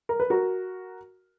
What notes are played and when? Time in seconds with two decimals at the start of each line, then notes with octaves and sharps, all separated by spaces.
0.09 A#4
0.20 B4
0.30 F#4 A#4